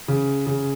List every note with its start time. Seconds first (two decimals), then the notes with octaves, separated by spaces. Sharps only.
0.08 C#3
0.46 C#3